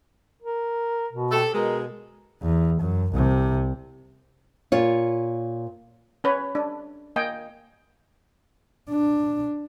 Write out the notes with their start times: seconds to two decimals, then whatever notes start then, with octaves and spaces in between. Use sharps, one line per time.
0.43 A#4
1.13 B2
1.32 C4 G4 A4
1.54 B2 G#3 A#4
2.42 E2
2.80 F#2
3.12 C2 C3
4.72 A#2 F4 C#5
6.24 C#4 B4 C#5
6.55 D4
7.16 A#3 D#5 G5 G#5
8.90 D4